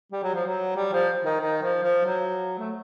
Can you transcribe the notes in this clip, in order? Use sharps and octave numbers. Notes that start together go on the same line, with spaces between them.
G3
F#3
F3
F#3
G3
F3
D#3
D#3
F3
F3
F#3
A3